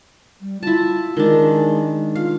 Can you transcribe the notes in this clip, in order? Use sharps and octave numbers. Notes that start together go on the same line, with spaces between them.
G3
E4 F4 A5
D#3 G#3 D4
F4 F5